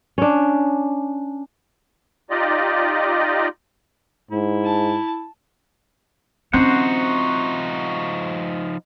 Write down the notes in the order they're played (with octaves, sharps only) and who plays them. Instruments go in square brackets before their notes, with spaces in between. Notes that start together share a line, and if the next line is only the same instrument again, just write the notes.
[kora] C#4 D4
[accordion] D#4 F4 G4 D5 D#5
[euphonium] G#2 [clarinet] E4
[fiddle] A5
[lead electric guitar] F3 D#4 [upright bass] C4 C#4 [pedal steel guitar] F#4 C5 F#5